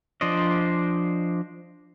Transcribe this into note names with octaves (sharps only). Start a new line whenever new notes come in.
F3 D4 C5 D5 D#5